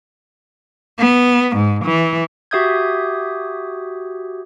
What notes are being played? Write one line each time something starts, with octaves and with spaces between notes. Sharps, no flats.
B3
G#2
E3
F#4 G4 E5 D#6 G6 G#6